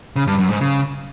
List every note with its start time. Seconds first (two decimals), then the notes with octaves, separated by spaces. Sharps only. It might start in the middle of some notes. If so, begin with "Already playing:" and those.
0.16 C#3
0.27 G2
0.39 F#2
0.50 G#2
0.61 C#3